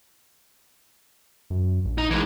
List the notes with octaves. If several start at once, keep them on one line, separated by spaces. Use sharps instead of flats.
F#2
A#1
D#4
E3 G#3